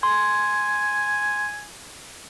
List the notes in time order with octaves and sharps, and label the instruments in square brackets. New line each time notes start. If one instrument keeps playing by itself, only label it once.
[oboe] G#5 [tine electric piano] C6